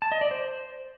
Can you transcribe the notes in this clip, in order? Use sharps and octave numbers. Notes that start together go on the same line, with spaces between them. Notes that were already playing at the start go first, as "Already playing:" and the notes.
A5
D#5
D5
C5